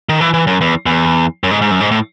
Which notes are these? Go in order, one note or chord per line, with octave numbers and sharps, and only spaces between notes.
D#3
E3
E3
F#2
E2
E2
F#2
G#2
G#2
F#2
G#2
A2